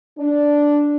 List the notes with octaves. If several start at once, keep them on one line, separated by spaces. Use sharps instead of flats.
D4